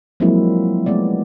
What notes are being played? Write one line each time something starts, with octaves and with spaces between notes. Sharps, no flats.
F3 F#3 G#3 A#3 C4 E4
G#3 A3 B3 D5